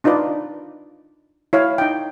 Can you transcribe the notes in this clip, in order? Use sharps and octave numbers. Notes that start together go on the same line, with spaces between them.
D4 D#4 F4 B4 D5
E4 C#5 F5
D#4 G5